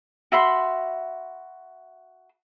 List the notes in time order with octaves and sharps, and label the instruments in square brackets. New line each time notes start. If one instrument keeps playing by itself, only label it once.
[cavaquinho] F#4 E5 B5 C6